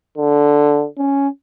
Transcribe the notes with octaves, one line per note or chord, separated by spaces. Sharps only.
D3
C#4